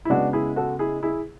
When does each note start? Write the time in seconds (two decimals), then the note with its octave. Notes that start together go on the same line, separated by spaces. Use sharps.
0.05 E4
0.10 C#3 G#3 B3 D4 F#4
0.33 E4 G#4
0.56 F#4 A4
0.79 E4 G#4
1.03 E4 G#4